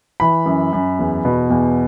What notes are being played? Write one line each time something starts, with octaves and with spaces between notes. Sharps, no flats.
E3 B5
F#2
F#2
E2
B2
E2